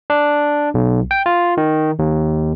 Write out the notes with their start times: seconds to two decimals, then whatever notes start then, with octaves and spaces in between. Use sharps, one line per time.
0.10 D4
0.74 B1
1.11 G5
1.26 F4
1.57 D#3
1.99 D#2